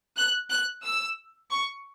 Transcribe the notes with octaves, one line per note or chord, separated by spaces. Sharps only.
F#6
F#6
E6
C#6